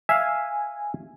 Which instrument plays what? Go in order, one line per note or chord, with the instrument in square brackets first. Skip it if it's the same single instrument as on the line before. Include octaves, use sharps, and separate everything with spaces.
[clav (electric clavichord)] E5 F5 [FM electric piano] G#5